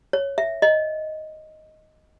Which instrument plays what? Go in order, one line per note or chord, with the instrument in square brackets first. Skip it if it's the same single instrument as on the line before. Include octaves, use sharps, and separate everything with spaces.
[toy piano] C#5
E5
D#5